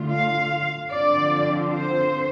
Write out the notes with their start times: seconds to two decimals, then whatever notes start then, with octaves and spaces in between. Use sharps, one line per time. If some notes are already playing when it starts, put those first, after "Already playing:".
Already playing: D3 A3 F4
0.11 F5
0.90 D3 F3 C4 F4 D5
1.70 C5